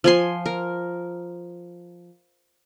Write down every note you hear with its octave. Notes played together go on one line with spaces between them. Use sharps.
F3 G#5 C6
A#4